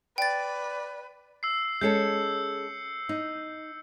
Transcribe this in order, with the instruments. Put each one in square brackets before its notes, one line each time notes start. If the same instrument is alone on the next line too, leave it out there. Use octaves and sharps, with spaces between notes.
[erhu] B4 [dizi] D5 [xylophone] G5 A6
[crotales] E6 C7
[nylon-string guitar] G#3 C#4 A4 [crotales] G6 C7 C#7
[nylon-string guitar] D#4